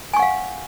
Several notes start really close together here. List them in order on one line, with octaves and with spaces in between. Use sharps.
G#5 C#6 F#5 F5